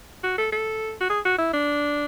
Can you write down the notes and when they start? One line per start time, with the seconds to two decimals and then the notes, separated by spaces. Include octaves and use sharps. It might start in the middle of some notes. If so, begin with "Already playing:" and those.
0.23 F#4
0.38 A4
0.52 A4
1.01 F#4
1.10 G#4
1.25 F#4
1.38 E4
1.53 D4